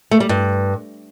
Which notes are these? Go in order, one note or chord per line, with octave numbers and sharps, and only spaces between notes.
A3
G3
G2